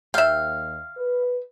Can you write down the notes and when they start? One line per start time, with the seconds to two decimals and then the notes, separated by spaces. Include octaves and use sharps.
0.14 D#2 E5 F5 G5
0.97 B4